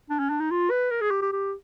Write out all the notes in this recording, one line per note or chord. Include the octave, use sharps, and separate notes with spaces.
D4
C#4
D4
D#4
F4
B4
A#4
G#4
G4
G4
G4